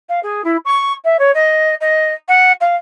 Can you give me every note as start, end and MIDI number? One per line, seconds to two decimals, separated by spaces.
0.09 0.20 77
0.23 0.42 68
0.44 0.57 64
0.65 0.93 85
1.04 1.17 76
1.19 1.31 73
1.34 1.75 75
1.81 2.12 75
2.28 2.52 78
2.61 2.75 77